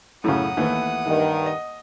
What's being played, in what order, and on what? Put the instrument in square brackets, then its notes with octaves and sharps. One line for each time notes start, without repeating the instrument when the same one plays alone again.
[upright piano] F#2 [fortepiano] A2 C#3 [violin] F#5 D#6
[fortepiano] D#2 [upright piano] E3 A3 B3
[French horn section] G2 D#3
[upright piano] D#5